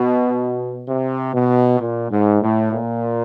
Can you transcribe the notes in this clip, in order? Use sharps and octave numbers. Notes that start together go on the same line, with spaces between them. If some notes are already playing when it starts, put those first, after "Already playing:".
Already playing: B2
C3
B2
A#2
G#2
A2
A#2